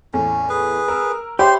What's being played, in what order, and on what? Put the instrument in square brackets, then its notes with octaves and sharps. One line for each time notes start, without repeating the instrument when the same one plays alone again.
[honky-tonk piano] E2 A2 [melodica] C#4
[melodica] G#4 B4
[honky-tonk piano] A#4 E6
[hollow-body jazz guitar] G4 [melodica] C5 C6 [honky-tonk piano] C#5 E5 B5